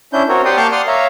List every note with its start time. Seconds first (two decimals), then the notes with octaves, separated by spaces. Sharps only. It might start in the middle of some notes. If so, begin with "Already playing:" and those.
0.13 C#4 D4 E4 G6
0.29 C4 F#4 A#4 C#5
0.45 G4 D5 F#5 G5 C6 D#6
0.57 A#3 A5 C#6 D6 F6 G6
0.72 D5 F#5 C6 D#6 F6
0.87 C#5 E5 F5 A#5